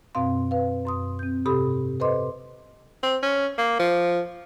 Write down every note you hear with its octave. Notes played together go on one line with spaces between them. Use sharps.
F#2 B2 C4 F5 C6
B4 F5
F#2 C6 D#6
C4 G6
G#2 C3 G4 A4 B5 D#6
A4 B4 C5 D#5 C6 D6
C4
C#4
A#3
F3